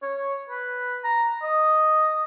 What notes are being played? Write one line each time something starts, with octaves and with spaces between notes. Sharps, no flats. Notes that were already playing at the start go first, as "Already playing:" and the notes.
C#5
B4
A#5
D#5